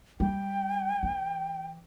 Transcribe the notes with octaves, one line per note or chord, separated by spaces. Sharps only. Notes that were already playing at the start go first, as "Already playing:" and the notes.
G3 G5
E3